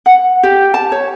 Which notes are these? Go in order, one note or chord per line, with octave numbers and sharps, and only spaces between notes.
F#5
G4
A5
C#5